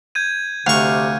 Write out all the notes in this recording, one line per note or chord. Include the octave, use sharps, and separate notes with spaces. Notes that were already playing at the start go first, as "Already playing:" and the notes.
G6 G#6 D#7
D2 C3 F5 C#6